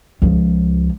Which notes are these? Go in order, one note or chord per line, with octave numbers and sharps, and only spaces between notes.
C#2 F3